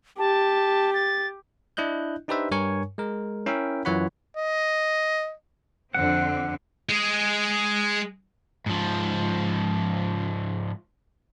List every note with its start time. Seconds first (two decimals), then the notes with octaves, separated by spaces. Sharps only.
0.19 G4 A5
0.94 A6
1.77 D4 E4 D#5 F#6 G6
2.28 D4 D#4 G4 B4 C5 E5
2.51 G2 A#4 C#5 G#5 C#6
2.98 G#3 A#4
3.46 C#4 E4 A#4 E5 G5
3.85 F#2 E3 F4 C#5 F#5 B5
4.37 D#5
5.94 F2 D3 C4 F#5
6.89 G#3 G#4
8.66 G#2 F3